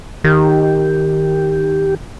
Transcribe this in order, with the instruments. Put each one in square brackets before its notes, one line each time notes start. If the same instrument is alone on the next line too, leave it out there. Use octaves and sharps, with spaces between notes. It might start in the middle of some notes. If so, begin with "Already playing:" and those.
[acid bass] D#3 [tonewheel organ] G4